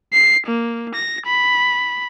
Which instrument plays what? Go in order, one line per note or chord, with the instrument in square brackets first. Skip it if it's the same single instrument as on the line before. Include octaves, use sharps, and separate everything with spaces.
[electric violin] C7
A#3
A#6
B5